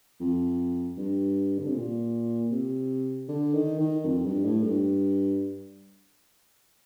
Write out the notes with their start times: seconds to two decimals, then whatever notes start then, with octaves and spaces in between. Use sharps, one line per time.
0.20 F2
0.97 G2
1.59 D3
1.67 C3
1.74 A#2
2.51 C3
3.28 D3
3.54 D#3
3.79 D#3
4.05 F2
4.25 G2
4.44 A2
4.63 G2